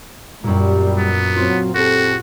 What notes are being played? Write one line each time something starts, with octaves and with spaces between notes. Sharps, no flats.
F#2 A#2 G3
B3
F#3 C4 F4
C4 F#4 G4 A4